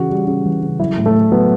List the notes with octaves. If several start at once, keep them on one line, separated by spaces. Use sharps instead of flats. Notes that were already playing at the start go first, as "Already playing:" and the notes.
Already playing: C#3 E3 F#4
G3
C#3
E3
C#3
F#3 E4
A2
A3
A2
F#3 B3